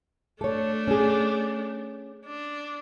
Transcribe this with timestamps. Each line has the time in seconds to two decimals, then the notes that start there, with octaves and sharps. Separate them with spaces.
0.41 A3 D4 A4 C#5
0.88 C#4 G#4
2.25 D4